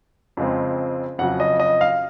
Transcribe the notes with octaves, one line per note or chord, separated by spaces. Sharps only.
F2 C#3 G#3 C4
F2 C#3 F#3 F#5
D#5
D#5
F5